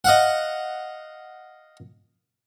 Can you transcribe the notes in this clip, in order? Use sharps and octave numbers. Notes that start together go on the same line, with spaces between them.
D#5 F5 F#5